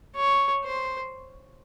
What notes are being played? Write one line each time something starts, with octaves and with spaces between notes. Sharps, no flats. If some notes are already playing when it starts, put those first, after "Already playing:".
C#5
C5